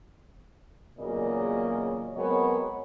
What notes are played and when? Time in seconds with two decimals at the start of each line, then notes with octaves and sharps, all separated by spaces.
0.99 E2 A#2 C#3 F#3 A#3 D#5
2.15 F#3 G#3 B3 C4 A#4 C#5